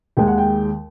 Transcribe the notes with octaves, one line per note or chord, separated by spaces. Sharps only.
D#2 D#3 G#3 G5
F#5
G5